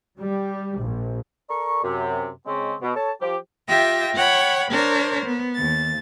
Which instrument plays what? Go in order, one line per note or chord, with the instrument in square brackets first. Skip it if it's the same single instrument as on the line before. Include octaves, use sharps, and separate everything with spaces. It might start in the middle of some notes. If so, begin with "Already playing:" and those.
[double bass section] G3
A#1
[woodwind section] A4 A#4 D5 A#5 C#6
F#2 C3
C#3 G#3 C4 C#4
B2
A4 C#5 A5
F3 G4
[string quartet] F4 G4 E5 G5 A#6
C#5 F#5 G5 B5
D4 A#4 C5 C#5
B3
D#2 A6